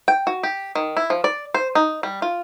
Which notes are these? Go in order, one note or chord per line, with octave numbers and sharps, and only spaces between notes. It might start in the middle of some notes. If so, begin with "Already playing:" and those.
G5
F#4
G4
D#3
E4
F3
D5
C5
D#4
G3
F4